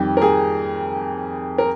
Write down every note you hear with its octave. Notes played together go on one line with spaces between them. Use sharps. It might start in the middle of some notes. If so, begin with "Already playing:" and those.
Already playing: F2 D#3 G3 G4
A#4
G#4
A#4